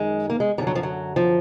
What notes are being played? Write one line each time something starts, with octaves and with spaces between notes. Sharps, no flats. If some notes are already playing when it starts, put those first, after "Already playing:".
Already playing: F#2 D#3 G#3
A#3
G#3
F#2 D3 F3 G3
F#3
F3
F#3
F3